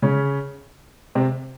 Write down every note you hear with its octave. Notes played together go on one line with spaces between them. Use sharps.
C#3 C#4
C3 C4